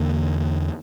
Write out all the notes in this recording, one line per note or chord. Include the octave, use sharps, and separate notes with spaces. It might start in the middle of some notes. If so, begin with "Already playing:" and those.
Already playing: E2 D3 A#3